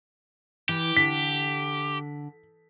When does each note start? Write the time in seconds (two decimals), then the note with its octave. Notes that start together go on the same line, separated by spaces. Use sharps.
0.69 E3 G4
0.97 D3 B6